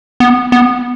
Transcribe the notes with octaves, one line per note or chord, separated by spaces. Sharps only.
B3
B3